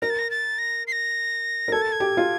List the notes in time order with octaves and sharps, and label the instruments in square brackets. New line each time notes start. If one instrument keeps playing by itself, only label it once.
[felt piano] A#4 [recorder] A#6
[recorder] A6
A#6
A6
A#6
C7
A#6
[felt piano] A#4
[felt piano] A4 [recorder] G#6
[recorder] A6
G#6
[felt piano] G4
F4